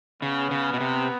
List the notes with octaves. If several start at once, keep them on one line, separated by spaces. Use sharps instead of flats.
C#3 B3
C#3
B2
C3